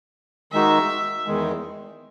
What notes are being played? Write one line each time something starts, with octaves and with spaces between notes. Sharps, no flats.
D#3 G#3 D#4 F#4 E5
E2 D#3 G#3